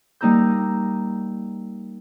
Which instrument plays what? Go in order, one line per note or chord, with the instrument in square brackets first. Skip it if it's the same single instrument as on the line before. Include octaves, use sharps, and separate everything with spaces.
[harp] G3 A#3 D#4 A#5 E6 G6